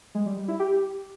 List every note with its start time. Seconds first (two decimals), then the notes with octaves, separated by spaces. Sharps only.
0.15 G#3
0.26 G3
0.37 G3
0.48 E4
0.59 G4